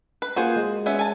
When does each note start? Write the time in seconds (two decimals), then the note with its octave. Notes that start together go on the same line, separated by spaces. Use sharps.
0.22 B4
0.36 A#3 F4 F#4 G#4 C5
0.56 G#3
0.86 B3 C#4 E5
0.99 G#5 A5